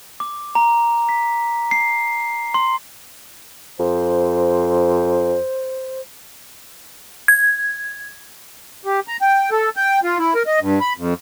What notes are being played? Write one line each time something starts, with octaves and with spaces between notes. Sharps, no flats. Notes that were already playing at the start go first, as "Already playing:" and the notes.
D6
A#5
B6
C7
C6
F2 C5
G#6
G4
A#5
G5
A4
G5
F4
E4
A#4
D#5
G2
B5
F2